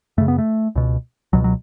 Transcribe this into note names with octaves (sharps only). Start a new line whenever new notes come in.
F#2 C#3 A3
B3
A3
C#2 B2
C#2 B2 F#3
F#3